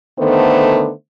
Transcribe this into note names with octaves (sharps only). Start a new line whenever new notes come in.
D3 D#3 A3 B3 C5